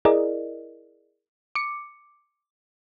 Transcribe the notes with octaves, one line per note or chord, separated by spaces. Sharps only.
E4 G#4 A#4 D5 D#5
D6 C#7